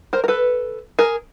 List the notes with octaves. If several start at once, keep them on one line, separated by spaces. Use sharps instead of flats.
A#4 C5
A#4
A4 B4
G#4 A#4